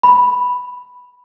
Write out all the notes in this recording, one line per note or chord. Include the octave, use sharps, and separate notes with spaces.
B5